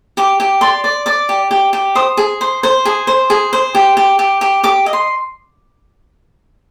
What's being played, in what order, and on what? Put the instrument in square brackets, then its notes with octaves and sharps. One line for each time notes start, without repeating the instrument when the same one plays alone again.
[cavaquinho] G4 D6
G4
D5 C6
D5
D5 D6
G4
G4
G4
C5 D#6
G#4
C5
C5
G#4
C5
G#4
C5
G4
G4
G4
G4
G4 D6
D#5
C6